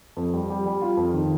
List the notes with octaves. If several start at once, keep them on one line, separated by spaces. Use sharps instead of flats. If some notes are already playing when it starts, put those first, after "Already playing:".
F2
G3
G3
G3
F4
F2
D#3